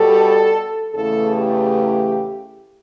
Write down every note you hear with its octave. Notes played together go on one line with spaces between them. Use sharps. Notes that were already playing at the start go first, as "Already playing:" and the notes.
Already playing: B2 G3 A4
E2 C#3 E3 A3 A4
G4